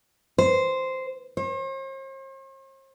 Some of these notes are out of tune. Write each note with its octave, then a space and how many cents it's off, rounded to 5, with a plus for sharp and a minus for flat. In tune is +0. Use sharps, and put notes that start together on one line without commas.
C5 -5
C5 +45